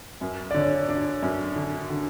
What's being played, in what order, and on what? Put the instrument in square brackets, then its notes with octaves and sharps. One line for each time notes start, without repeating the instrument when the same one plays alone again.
[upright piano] F#2
[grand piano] D5
[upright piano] D3 [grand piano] C#5
[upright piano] D4 [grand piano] D5
[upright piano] F#2
D3
D3